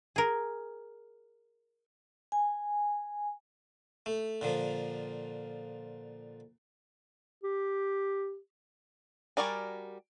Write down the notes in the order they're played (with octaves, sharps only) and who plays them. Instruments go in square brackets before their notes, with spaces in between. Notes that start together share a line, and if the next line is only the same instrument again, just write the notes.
[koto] G#4 A#4
[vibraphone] G#5
[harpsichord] A3
A#2 D3 F3
[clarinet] G4
[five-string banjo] G3 F#4 A#4 D5 G#5